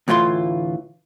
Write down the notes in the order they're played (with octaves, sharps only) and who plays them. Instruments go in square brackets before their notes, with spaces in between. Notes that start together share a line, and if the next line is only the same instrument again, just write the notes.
[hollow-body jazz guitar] D2 A2 E3 F4 C6